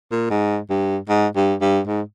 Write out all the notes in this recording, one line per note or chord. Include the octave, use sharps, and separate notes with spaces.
A#2
G#2
G2
G#2
G2
G2
G#2